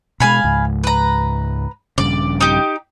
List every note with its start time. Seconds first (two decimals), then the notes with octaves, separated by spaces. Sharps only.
0.20 B2 G#3 F5 G#5 B5
0.44 C#2 G#2
0.84 B4 A#5
1.98 A#1 G2 C#3 D5 D6
2.41 D#4 G4